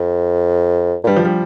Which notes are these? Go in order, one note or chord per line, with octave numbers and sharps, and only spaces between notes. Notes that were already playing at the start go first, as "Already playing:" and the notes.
Already playing: F2
A#2
G2 G3
F3
G3